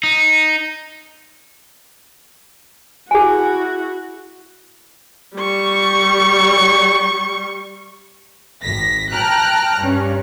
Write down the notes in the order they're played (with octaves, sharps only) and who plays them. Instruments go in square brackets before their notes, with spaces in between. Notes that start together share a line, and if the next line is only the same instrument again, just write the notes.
[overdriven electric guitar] D#4
[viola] E4 F#4 [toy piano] G#4 G#5
[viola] G3 C#6
[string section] G#1 A#6 B6
G5 A5 A#5 F6 F#6
G2 C#4